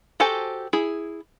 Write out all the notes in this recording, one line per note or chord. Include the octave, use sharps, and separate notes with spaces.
F#4 G4 A4 C5 G#5
E4 G#4